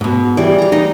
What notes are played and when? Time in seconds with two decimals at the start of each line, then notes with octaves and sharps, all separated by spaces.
0.01 G#2 B2
0.37 E3 G3 G#4 D5
0.58 F5 A#5
0.72 D#4